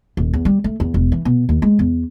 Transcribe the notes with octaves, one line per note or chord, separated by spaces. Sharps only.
D#1
E2
G3
A3
E2
E1
E3
B2
D#2
G#3
E2